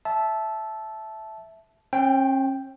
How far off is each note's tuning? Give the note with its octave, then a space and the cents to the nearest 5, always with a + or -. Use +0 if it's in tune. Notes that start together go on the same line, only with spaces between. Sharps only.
E5 +0 A5 -15
C#4 -45 G5 +0